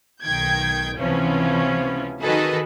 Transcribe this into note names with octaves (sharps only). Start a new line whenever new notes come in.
B1 D#3 G5 G6 G#6
C#2 C3 E3 F3 B3 C#4
D#3 F#4 G#4 A4 B4 D#5